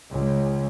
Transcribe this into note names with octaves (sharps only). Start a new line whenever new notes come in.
C#2